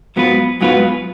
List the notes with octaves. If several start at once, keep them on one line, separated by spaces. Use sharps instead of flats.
G#2 F#3 B3 F4 B4
G#2 F#3 B3 F4 B4